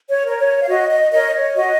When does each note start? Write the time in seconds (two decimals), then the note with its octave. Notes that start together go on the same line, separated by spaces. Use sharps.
0.09 C#5
0.24 A#4 C#5
0.39 C#5
0.62 F5
0.68 F#4 D#5
0.89 D#5
1.12 A#4 C#5 D#5
1.34 C#5
1.56 F#4 D#5